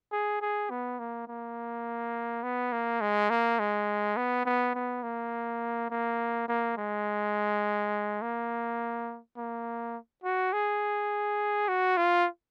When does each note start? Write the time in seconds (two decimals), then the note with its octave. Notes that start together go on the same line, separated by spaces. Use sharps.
0.12 G#4
0.41 G#4
0.71 B3
0.99 A#3
1.28 A#3
2.43 B3
2.72 A#3
3.01 G#3
3.30 A#3
3.59 G#3
4.17 B3
4.46 B3
4.75 B3
5.03 A#3
5.91 A#3
6.49 A#3
6.77 G#3
8.22 A#3
9.37 A#3
10.24 F#4
10.53 G#4
11.68 F#4
11.97 F4